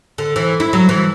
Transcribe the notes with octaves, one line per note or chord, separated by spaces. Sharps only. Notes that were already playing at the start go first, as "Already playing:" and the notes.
D3
E3
E4
F#3
E3